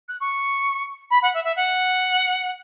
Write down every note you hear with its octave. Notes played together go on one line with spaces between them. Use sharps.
F#6
C#6
B5
F#5
E5
E5
F#5